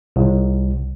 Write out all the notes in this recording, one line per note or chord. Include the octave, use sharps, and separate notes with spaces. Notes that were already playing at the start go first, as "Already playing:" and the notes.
C2